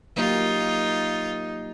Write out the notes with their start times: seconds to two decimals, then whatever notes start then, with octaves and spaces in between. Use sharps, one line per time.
0.16 F#3 A#3 D#4 F4 G4